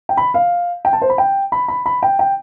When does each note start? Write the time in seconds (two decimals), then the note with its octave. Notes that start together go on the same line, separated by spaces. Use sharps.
0.09 G5
0.17 B5
0.34 F5
0.85 G5
0.93 A5
1.02 C5
1.10 B5
1.18 G5
1.52 B5
1.68 B5
1.86 B5
2.03 G5
2.19 G5